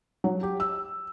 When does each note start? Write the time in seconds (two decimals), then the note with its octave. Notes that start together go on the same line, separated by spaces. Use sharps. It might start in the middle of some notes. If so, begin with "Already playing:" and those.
0.24 F#3
0.43 G4
0.60 E6